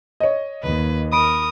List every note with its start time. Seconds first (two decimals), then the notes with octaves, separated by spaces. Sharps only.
0.20 C#5 D#5
0.63 D#2 B4
1.13 A#4 B5 D#6 D7